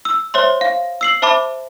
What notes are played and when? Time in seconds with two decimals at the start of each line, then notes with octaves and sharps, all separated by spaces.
0.05 E6
0.34 C5 C#5 E5 C6
0.61 F5
1.01 E6 C7 F#7
1.22 C5 E5 A5 B5 D6